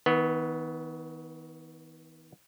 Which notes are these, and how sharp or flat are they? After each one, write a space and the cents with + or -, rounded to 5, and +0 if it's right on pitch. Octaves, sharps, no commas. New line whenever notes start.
D#3 +40 B3 +0